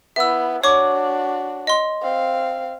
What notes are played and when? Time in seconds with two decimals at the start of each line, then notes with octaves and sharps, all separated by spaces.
0.16 B3 E4 E5 E6
0.64 D4 F#4 C#5 C#6 D6
1.67 D#5 C6
2.02 C4 F5